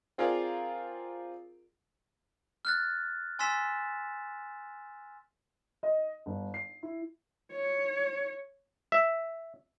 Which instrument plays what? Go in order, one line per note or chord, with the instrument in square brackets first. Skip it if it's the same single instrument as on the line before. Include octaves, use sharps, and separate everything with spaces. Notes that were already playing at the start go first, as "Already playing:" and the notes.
[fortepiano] C4 F4 G#4 A#4 D5
[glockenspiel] F6 F#6 A6
G#5 C6 E6 A6 B6 E7
[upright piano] D#5
G1
C7
E4
[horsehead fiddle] C#5
[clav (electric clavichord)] E5